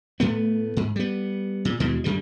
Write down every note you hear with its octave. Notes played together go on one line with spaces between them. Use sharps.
A2 A3 B3
G#2
G3 B3
A#2
D#2 B2 E3 G#3
F#2 D3 G3